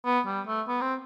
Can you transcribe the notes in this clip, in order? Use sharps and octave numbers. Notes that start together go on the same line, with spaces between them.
B3
G3
A3
B3
C4